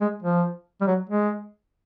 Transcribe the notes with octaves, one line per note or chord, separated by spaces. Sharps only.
G#3
F3
G3
F#3
G#3